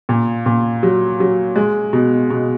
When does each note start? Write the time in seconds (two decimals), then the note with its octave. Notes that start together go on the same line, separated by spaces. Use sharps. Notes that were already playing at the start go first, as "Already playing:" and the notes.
0.09 A#2
0.46 A#2
0.83 F#3
1.20 F#3
1.56 G#3
1.93 B2
2.30 B2